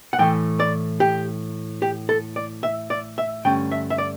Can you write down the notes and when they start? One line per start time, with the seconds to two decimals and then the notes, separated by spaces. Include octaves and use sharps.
0.13 F#5
0.19 A2 E3 A3 G5
0.60 D5
1.00 G4
1.82 G4
2.09 A4
2.36 D5
2.63 E5
2.90 D5
3.18 E5
3.45 G2 D3 A3 C#4 G5
3.72 E5
3.90 E5
3.98 D5